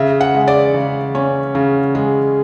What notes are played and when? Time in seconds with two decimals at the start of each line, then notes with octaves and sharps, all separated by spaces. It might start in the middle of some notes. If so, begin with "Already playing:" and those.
Already playing: C#3 E5
0.21 F#5
0.34 G#3
0.48 D5
0.74 C#3
1.15 C#4
1.55 C#3
1.95 G#3